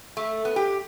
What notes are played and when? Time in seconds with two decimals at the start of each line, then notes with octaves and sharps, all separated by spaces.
0.17 A3
0.45 B3
0.56 G4